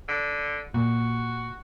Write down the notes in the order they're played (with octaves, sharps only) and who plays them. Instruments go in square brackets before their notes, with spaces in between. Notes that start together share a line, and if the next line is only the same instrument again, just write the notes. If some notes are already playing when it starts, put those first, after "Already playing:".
[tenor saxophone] D3
[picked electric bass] A#2 [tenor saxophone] F#4